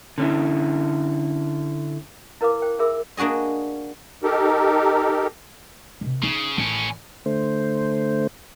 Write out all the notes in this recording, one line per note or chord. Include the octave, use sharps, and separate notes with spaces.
D3 C#4 E4
E4 A#4 B4 F5 D6
C5 G5
D#4 G#4 A#4 E5 B5 E6
A#3 D4 F#4 G#4 D#5
D#4 G4 A4 A#4
C3 D#3
C#3 D#4
A1 A2 D#3 C#4
D3 A3 C5